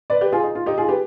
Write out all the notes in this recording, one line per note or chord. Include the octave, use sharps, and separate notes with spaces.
B4 D5
G4 B4
F4 G#4
D#4
F4
D#4 G4
F4 G#4
G4 B4